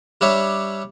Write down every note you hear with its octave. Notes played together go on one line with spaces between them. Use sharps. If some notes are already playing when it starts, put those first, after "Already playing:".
G3 D4 C#5 E5